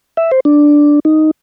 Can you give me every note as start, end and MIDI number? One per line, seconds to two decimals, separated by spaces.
0.17 0.31 76
0.31 0.40 72
0.45 1.00 62
1.05 1.31 63